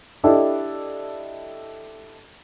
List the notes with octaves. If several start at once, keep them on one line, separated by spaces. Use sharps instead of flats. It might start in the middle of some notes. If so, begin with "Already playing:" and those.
D4 E4 G4 A4 D5 D#5